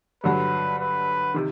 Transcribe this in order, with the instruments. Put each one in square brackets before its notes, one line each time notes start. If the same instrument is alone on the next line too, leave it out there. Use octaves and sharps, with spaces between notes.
[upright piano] G2 D3 F#3 [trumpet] B4
[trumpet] B4
[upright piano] C3 D#3